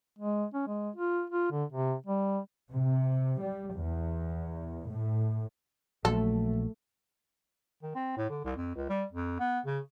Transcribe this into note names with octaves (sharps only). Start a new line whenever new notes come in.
G#3
C#4
G#3
F4
F4
D3
C3
G3
C3
G3
E2
A2
A#1 F#3 A3 A4
D#3
C4
A2
D3
C2
F2
C#2
G3
F2
B3
C#3